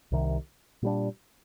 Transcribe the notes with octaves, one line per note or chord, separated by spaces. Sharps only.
C2 C3 D#3
A#2 G3 D4